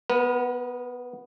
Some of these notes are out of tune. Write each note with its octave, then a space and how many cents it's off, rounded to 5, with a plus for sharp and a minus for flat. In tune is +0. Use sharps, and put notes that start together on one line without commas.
B3 +0 A#4 +45